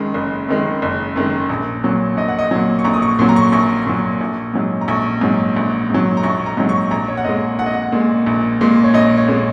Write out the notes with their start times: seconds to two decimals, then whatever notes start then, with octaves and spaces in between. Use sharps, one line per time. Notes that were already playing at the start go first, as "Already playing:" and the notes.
Already playing: F#1 F#2 D#3 G#3 D#5
0.14 F#1
0.48 F#2 D#3 G#3
0.82 F#1
1.16 F#2 D#3 G#3
1.49 A#1
1.84 A#2 F#3
2.17 A#1 D#5
2.28 F#5
2.39 D#5
2.51 A#2 F#3
2.79 C#6
2.84 A#1 A#5
2.94 D#6
3.02 C#6
3.19 A#2 F#3
3.29 A#5
3.36 C#6
3.52 A#1 C#6
3.86 A#2 F#3
4.21 A#1
4.54 G#2 F#3
4.81 A#5
4.88 A#1 C#6
5.21 G#2 F#3
5.56 A#1
5.89 G#2
5.94 F#3
6.17 A#5
6.23 A#1 C#6
6.46 A#5
6.57 G#2 F#3
6.69 C#6
6.91 A#1 A#5
7.08 C#5
7.17 F#5
7.25 A#2 G#3 D#5
7.59 A#1 F#5
7.66 D#5
7.74 F#5
7.92 A#2 G#3
8.26 A#1
8.61 A#2 G#3
8.84 C#5
8.94 A#1 D#5
9.17 C#5
9.28 A#2 G#3